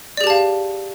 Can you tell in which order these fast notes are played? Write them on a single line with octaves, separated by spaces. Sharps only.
D5 G#4 G4 A5 F5